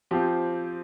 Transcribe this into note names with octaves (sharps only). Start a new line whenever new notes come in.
F3 C4 G4